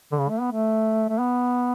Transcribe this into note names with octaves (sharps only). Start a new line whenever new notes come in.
D3
C#3
A3
B3
A3
A3
B3